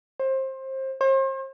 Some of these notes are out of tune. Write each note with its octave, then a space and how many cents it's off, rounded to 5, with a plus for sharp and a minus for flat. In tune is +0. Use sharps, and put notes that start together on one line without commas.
C5 +25
C5 +40